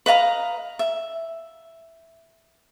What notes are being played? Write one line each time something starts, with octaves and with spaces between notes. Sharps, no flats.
B4 D#5 F5 A#5
E5